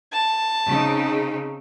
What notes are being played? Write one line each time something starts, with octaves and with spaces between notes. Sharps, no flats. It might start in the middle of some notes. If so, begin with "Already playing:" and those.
A5
C#3 C4 D#4